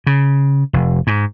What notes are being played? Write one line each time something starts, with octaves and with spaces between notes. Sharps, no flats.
C#3
F1
G#2